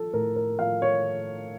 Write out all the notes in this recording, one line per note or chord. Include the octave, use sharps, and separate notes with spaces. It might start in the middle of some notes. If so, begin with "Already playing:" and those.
Already playing: F3 A4
A2 A#4
A#4
F3 F5
C#5